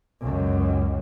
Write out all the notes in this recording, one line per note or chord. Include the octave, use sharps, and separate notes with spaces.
C#2 F#2